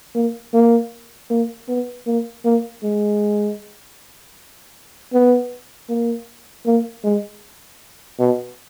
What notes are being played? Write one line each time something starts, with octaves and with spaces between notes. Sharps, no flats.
A#3
A#3
A#3
B3
A#3
A#3
G#3
B3
A#3
A#3
G#3
B2